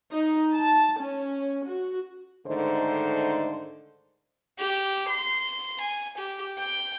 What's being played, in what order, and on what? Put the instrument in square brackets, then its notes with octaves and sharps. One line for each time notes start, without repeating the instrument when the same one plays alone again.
[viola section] D#4
A5
C#4
F#4
[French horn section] G#2 D3 D#3 A3 D#4 C5
[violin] G4
C6
G#5
G4
G5